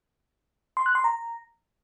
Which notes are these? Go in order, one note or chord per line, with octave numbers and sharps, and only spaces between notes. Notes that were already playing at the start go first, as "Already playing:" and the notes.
C6
F#6
C6
A#5